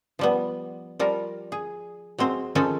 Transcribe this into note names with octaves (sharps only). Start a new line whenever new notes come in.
F3 G3 B3
F3 G3 A#4
G#4
F#3 G#3 C4 C5
D#3 F3 G#3 C#4 D#4 A4